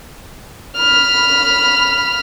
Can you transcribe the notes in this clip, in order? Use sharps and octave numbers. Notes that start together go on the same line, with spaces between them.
B5 F6